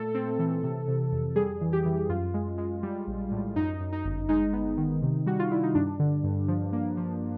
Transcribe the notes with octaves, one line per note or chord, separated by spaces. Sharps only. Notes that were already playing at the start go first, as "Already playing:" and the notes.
Already playing: A#2 A3 A4
C4
E3
C3
C3
F2
G3 G#4
E3
G4
E3
F#2 F4
G#3
G#3
G3
A#1
A2
F#2 D#4
F#2
D#4
G1
G#3 D#4
B3
D#3
C3
G3 F#4
F4
G3 E4
D#4
G2 D4
D3
G2
F3
A#3
F3